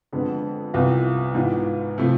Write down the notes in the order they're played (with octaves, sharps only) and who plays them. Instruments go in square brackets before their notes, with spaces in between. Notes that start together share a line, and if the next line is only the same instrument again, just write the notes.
[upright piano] F2 D3 G#3 B3
C2 C3 E3 B3 F4
G#2 E3 B3 F4
C3 F3 A3